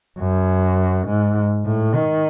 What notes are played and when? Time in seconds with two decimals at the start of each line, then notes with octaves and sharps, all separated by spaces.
0.19 F#2
1.07 G#2
1.66 A2
1.95 D#3